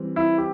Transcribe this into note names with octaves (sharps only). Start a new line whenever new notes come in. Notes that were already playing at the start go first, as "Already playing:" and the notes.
Already playing: E3 G3 C4
E4
G4